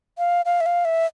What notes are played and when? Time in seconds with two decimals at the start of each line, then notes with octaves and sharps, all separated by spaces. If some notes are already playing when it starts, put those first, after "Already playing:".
0.18 F5
0.46 F5
0.61 E5
0.66 F5
0.85 E5